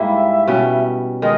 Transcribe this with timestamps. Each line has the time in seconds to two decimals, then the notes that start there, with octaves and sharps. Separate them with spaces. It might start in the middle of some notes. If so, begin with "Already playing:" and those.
Already playing: G#2 G3 A#3 E4 E5
0.47 B2 G3 C#4
1.22 D#3 G#3 D#5